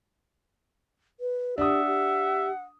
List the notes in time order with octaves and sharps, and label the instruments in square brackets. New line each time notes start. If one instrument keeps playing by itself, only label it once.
[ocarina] B4
[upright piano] D4 D#6 [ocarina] G4 [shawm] E5 [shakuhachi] F#5
[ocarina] G4